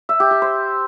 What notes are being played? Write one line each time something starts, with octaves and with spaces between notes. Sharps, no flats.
E5
G4
G4
C5